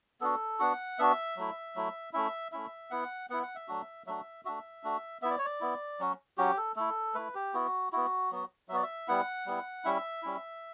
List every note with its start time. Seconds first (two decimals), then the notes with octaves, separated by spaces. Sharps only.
0.21 B3 D4 F#4 A4
0.59 B3 D4 F#4 F#5
0.99 B3 D4 F#4 E5
1.36 F#3 A3 E4
1.75 F#3 A3 E4
2.13 A3 C#4 E4 E5
2.52 A3 C#4 E4 E5
2.91 B3 E4 F#5
3.30 B3 E4 F#5
3.43 F#5
3.55 E5
3.68 F#3 A3 D4 F#4
4.07 F#3 A3 D4 F#4 E5
4.45 A3 D4 F#4 E5
4.84 A3 D4 F#4
5.22 B3 E4 E5
5.30 D5
5.38 C#5
5.45 D5
5.61 B3 E4
6.00 F#3 C#4 F#4
6.38 F#3 C#4 F#4 G4
6.57 A4
6.76 A3 E4 A4
7.14 A3 E4 B4
7.35 G4
7.54 B3 E4 F#4
7.92 B3 E4 F#4
8.31 F#3 B3 F#4
8.69 F#3 E5
8.72 B3 F#4 D5
8.83 E5
9.08 G3 B3 E4 F#5
9.46 G3 B3 E4
9.84 G3 C#4 E4 E5
10.23 G3 C#4 E4